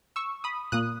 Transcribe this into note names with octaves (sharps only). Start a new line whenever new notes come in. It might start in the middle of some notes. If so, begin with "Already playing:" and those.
C#6 E6
B5 D#6
A#2 A#3 D#6 F#6